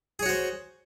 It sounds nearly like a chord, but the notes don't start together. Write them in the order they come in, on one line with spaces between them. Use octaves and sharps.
G#4 C#5 F#4 C5